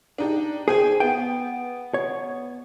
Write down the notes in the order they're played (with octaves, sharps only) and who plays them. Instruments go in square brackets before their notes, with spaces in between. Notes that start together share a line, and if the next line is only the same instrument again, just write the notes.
[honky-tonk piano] D4 D#4 G4
[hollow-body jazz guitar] G#4 [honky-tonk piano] C5 G5 G#5
[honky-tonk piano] B3 [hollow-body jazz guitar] G5
[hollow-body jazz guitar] C#5